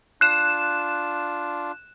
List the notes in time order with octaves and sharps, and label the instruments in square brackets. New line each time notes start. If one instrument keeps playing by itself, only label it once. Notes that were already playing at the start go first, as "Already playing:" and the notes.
[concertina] D4 F4 [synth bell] F#6 E7